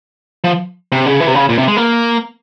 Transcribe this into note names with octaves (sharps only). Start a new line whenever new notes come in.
F3
C3
C#3
E3
C3
C#3
A#2
C3
G#3
A#3